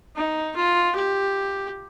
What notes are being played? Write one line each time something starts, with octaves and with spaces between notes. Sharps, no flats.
D#4
F4
G4